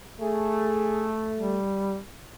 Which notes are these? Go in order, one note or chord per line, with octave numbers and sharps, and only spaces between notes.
A3 G#4
G3